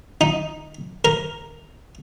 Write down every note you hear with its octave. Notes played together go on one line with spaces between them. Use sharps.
D#4
A#4